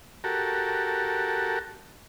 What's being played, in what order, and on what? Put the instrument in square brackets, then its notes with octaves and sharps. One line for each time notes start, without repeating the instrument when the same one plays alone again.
[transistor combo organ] F#4 G4 A4 A#4